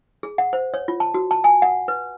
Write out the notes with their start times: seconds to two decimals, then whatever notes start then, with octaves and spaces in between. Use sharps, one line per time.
0.23 G#4
0.38 F#5
0.53 C5
0.74 C#5
0.88 F4
1.00 A5
1.14 F#4
1.31 A5
1.44 G#5
1.62 F#5
1.88 B4